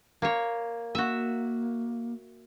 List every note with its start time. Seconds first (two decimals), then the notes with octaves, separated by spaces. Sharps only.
0.22 A#3 C#5
0.95 A#3 F#4 E5